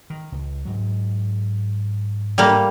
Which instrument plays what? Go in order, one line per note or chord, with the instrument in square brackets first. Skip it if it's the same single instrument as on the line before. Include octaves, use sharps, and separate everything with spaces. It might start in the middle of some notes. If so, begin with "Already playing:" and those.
[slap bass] D#3
C#2
G#2 F#3
[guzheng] G3 A#3